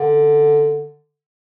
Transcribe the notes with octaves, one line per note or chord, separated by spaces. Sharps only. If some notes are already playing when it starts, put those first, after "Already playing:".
Already playing: D3